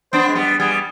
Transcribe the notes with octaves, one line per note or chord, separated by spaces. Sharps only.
B3 D4 C5
G#3
G3 B3
G3 B3 G#4